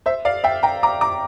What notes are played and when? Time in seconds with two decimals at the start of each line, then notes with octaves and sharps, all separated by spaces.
0.06 C5 E5
0.25 D5 F5
0.44 E5 G5
0.63 G5 A#5
0.83 A#5 D6
1.01 A#5 D6